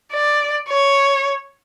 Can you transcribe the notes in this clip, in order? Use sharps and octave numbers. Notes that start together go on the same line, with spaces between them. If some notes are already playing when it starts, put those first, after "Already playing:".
D5
C#5